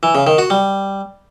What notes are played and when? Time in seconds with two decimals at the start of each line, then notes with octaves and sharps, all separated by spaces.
0.03 E3
0.15 C#3
0.27 D#3
0.38 F#4
0.50 G3